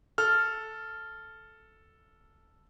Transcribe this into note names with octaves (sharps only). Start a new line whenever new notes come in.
A4 F6